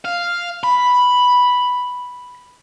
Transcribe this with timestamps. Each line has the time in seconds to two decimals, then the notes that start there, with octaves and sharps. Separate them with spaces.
0.05 F5
0.64 B5